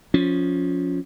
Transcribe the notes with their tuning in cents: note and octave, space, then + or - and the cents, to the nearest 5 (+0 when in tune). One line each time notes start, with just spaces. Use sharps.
F3 +15 C#4 +15